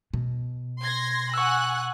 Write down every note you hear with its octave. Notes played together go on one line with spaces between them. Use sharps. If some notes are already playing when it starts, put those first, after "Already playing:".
B2
C6 G#6 A#6
F#5 G#5 C#6 E6 F#6